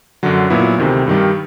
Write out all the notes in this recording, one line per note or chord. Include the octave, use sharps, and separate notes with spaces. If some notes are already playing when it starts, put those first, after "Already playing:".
F#2 D3 F#3
A#2 F#3 B3 E4
D2 C3 D#3
G2 D#3 G3